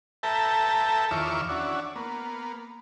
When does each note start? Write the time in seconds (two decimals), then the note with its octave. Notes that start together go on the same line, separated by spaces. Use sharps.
0.23 A4 B4 E5 G5 A5 A#5
1.11 E2 D#3 F4 C#5 E5 D6
1.49 C#4 D4 E4 F#4
1.96 A#3 B3